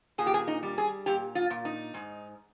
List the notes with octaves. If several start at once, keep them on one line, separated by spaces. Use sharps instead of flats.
A#2 G#4
G4
G#4
D#4
G3
G#4
A#2 G4
F4
A#2
D#4
G#2